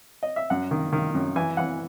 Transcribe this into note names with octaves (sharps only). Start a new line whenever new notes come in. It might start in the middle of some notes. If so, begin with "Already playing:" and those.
D#5
E5
F#2 F#5
D#3
D#3
F#2
E3 G#5
E3 F#5